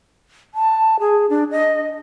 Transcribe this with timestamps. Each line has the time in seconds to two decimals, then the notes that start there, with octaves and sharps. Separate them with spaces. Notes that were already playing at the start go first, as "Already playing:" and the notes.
0.54 A5
1.00 G#4
1.30 D4
1.51 D#5